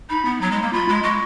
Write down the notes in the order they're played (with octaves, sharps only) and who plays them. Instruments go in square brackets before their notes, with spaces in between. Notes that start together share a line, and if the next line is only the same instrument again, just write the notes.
[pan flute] D#4 [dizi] B5
[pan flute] B3
[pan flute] F#3 [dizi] A#5
[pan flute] G#3
[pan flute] A#3 [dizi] A#5
[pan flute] F4 [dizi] B5
[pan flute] G#3
[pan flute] G#3 [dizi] C#6